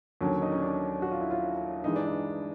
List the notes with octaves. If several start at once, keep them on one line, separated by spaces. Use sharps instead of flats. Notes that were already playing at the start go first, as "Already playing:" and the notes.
D#2 D3 F#3 C#4
D#4
C#4
D4
F#4
F4
E4
F4
G2 E3 G#3 D#4
D4
D#4